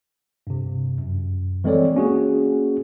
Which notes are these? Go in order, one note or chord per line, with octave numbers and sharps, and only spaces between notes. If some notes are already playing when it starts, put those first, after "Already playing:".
G2 C3
F#2
E3 G#3 C4 A4 C#5 D5
A#3 C#4 F#4 G#4